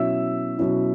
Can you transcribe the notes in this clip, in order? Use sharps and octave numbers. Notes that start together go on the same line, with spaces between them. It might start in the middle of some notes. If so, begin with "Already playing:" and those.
Already playing: B2 F#3 C#4 E4 E5 E6
B2 F#3 C#4 E4